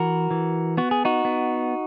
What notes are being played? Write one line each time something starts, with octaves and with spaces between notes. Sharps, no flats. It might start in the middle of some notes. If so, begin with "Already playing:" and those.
Already playing: E3 F#4 A#4
E3
B3 F#4
G#4
D#4 F#4
B3